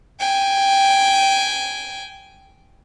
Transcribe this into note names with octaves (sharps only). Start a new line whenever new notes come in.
G5 G#5